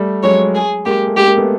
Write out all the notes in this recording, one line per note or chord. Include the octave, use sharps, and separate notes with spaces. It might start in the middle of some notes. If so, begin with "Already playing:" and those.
Already playing: G3 A3
F#3 G#3 C#5
G#4
G#3 A#3 G4
A3
G#3 A#3 G4
G#3 A#3
A3 B3